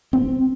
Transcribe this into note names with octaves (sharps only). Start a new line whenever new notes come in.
C4